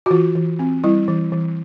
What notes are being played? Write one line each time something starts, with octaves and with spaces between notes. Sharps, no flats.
F#4
E3 F4
E3
C4
G3 E4
E3
E3